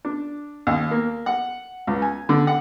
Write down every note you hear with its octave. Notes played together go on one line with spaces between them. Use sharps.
D4
D#2
A#3
F#5
C#2
G#5
D3
F#5